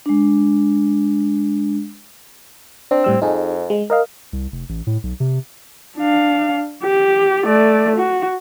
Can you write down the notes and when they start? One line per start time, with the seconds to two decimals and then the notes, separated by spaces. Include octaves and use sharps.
0.06 G#3 D4
2.91 C4 D4
3.04 A2 G3 E6
3.22 F2 D#4 G#4
3.70 G#3
3.90 A#4 D#5 F5
4.33 C2
4.52 F1
4.69 A1
4.87 A2
5.03 B1
5.20 C3
5.97 D4 F5
6.84 G4
7.44 A3 D5
7.96 F#4